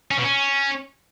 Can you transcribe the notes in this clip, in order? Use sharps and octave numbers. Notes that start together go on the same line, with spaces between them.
C#4
B2
C#4